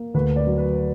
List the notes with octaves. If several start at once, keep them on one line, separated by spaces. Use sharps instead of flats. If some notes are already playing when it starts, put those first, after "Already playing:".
Already playing: A#3
D2 B4
D5
F#3
B4